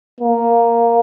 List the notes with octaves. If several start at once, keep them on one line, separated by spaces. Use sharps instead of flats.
A#3